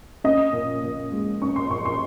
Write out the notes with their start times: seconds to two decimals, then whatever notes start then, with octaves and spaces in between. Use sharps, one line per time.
0.24 C#4 D#5
0.53 A#2
0.83 A#2
1.12 G#3
1.42 C#4 C#6
1.56 C6
1.71 A#2 C#6
1.85 C6